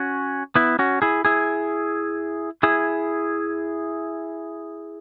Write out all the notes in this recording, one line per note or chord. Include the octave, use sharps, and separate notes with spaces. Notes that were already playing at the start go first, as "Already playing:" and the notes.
Already playing: C#4 F#4
B3 E4
C#4 F#4
E4 G#4
E4 G#4
E4 G#4